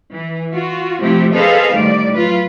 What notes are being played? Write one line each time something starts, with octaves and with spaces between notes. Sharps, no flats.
E3
F4 F#4
C3 F3 A3 C4 E4 G4
G#4 A4 B4 C5 D#5 F5
A2 D#3 G3 D5
F#3 F4 B4